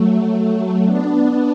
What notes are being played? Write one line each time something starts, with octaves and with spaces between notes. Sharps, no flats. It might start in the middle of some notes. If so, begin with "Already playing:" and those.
Already playing: F#3 A3
B3 D4